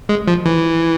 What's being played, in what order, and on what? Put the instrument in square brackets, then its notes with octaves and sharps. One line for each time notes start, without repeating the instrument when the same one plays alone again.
[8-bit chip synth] G#3
F3
E3